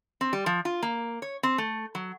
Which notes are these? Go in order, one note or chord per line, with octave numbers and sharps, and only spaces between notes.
C4
G3
F3
F4
A#3
C#5
C4
A3
F#3